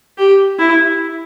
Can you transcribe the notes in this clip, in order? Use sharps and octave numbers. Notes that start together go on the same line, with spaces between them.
G4
E4